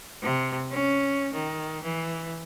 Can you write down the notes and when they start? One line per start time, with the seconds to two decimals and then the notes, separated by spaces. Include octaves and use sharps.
0.21 C3
0.70 C#4
1.33 D#3
1.83 E3